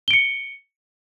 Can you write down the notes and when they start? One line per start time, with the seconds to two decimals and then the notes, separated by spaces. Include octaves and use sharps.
0.08 G7
0.11 D7
0.13 C#7